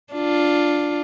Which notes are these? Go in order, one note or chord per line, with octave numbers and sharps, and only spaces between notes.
D4 F4